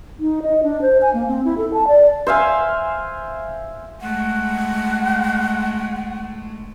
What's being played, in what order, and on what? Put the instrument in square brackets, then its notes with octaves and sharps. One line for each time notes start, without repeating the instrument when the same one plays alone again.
[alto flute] D#4
D#5
D4
C5
G#5
A#3
C4
E4
A4
A5
D5
[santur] C5 E5 F5 G#5
[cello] G#3 A3 [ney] F#5